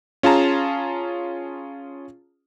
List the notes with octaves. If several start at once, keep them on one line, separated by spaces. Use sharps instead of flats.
C#4 F4 G#4 A5 A#5